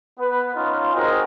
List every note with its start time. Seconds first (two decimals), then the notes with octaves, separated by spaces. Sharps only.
0.19 B3 B4
0.55 C#4 D#4 F4
0.94 C4 D#4 F#4 G#4 A#4